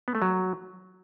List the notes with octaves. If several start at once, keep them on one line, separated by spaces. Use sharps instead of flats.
B3
A3
F#3